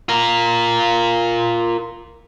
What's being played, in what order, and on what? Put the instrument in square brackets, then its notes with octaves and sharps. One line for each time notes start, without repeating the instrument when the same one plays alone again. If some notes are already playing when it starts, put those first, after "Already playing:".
[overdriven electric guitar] F4 A#4